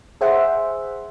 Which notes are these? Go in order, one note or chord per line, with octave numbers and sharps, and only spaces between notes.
G#4 C5 E5 F#5